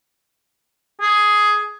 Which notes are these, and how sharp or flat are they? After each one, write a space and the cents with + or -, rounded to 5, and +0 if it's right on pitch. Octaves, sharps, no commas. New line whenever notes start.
G#4 +10